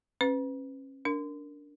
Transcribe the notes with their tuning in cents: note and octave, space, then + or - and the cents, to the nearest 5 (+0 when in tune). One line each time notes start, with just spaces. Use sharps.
C#4 -35 B4 +20
D4 -15 A#4 -5